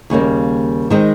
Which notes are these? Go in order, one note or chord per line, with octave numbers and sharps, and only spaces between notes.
D#2 C#3 G3 A#3
D#3 G#3 C4 D#4